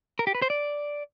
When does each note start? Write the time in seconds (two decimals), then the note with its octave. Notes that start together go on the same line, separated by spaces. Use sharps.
0.19 A#4
0.27 G4
0.35 B4
0.42 C5
0.50 D5